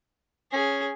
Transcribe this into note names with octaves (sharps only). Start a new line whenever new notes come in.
C#4 G#4